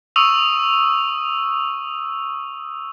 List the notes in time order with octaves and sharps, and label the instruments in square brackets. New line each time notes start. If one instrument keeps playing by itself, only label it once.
[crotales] C#6 D#6 E6 D#7 F7